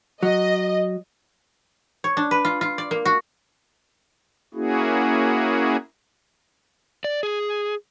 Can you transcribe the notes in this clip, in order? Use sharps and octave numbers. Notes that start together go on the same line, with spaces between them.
F#3 D#5
C#5
D4
B4
F4
F4
D5
A#3
F#4
A#3 C#4 E4 F#4 G#4
D5
G#4